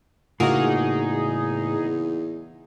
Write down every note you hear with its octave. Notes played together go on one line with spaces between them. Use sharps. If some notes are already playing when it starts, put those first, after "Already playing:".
E2 A2 C#3 A#3 D#4 F4 F#4 G#4